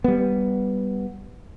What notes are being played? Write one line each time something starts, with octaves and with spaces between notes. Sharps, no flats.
G3 B3